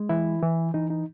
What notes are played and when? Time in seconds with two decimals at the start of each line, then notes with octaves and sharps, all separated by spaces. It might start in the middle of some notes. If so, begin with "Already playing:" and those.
Already playing: G#3
0.09 E3 E4
0.42 E3
0.74 E3 D#4
0.90 D#4